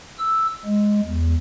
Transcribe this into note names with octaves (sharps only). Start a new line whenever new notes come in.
E6
G#3
E2